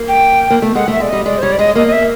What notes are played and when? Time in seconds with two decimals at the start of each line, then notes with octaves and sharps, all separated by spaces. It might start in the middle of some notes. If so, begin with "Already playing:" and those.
Already playing: A#3
0.08 G5
0.50 A#3
0.62 A3
0.75 G#3 F#5
0.88 A3 E5
1.00 G#3 D5
1.09 G3 D#5
1.25 G#3 D5
1.38 C5
1.42 G3 C#5
1.52 D5
1.59 G#3 D#5
1.75 A#3 D#5
1.87 D#5
1.92 E5